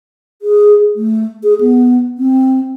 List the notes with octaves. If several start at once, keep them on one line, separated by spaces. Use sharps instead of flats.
G#4
A3
G#4
B3
C4